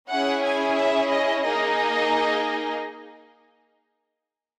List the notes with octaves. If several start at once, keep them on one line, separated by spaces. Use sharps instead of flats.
C#4 E4 G#4 F#5
G#5
E5
D#5
A#3 D#4 G#4 D#5